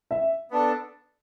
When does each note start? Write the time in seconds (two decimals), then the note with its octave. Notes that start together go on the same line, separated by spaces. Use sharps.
0.11 E5
0.51 B3 D4 A4